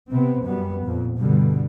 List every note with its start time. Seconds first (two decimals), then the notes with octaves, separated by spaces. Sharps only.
0.10 C3 B3 C4
0.44 F#2 G3 B3
0.84 F2 A#2
1.17 G2 B2 D3 G3